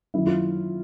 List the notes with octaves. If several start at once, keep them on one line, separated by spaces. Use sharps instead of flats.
F#2 D#3 F#3 E4
F4